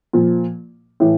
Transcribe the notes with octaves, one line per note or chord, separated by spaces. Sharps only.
A#2 F3
A2 E3